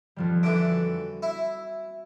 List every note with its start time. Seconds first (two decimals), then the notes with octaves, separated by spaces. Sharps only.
0.16 F2 F3 G3
0.43 D3 E3 D7
0.70 F#4
1.22 E4